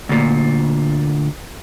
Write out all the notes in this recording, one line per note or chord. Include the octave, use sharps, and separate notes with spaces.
D2 A#2